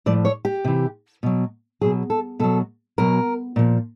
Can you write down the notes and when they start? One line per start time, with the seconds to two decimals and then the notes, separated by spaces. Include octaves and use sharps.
0.06 A2 F3 D5
0.25 C#5
0.45 G4
0.65 C3 E3
1.23 B2 F#3
1.81 B2 F#3 G#4
2.10 A4
2.39 B2 F#3 A4
2.98 B2 F#3 A#4
3.56 A#2 F3